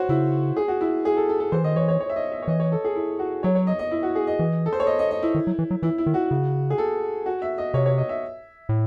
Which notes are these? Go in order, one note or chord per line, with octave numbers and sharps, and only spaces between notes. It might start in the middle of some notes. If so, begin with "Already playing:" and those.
Already playing: F#4 C5 C#5
C#3 E4
G#4
F#4
E4
G#4
A4
A4
A4
E3 C5
D#3 D#5
E3 C#5
C#5
C#5
E5
D#5
E5
C#5
E3 D#5
C#5
A4
G#4
E4
F#4
F#3 C#5
C#5
D#5
D#5
E4
F#4
G#4
D#5
E3
A4
C5
C#5
D#5
D#5
D#5
E4
D#3
F#3
E3
F#3
E3 E4
E4
D#3
F#4
C#3
G#4
A4
F#4
E5
D#5
C3 C#5
C#5
D#5
E5
A2